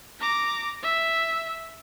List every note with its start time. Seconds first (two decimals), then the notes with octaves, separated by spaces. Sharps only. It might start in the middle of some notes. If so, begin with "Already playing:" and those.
0.20 A#5 D6
0.83 E5